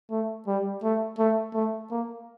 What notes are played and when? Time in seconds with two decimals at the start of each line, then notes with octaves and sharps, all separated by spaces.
0.10 A3
0.47 G3
0.83 A3
1.18 A3
1.54 A3
1.90 A#3